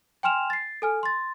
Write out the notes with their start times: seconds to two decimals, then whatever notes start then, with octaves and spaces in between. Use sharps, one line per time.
0.23 G5 G#5 C6 F6 E7 F7
0.50 A6 C7
0.82 A4 G#5 F6
1.03 C6 A6